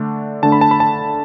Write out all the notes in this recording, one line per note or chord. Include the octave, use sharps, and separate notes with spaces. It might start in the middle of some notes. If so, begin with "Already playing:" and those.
Already playing: D3 A3 D4
D3 A3 D4 A5
B5
A5
B5
A5